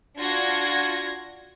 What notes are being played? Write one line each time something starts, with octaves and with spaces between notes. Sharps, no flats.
D4 F4 F#4 G#6 A#6